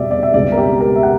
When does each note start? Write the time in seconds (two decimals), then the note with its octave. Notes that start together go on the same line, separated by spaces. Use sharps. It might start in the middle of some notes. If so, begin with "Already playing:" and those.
Already playing: E2 B2 G3 D5 E5
0.11 D5
0.23 E5
0.34 C#2 B2 G3 D5
0.52 A#4
0.58 G4
0.81 A#4
0.95 E5
1.03 F#5